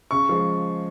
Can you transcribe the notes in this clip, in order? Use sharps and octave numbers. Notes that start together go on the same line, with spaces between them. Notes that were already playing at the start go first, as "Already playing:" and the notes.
C#3 C#6
F3 G#3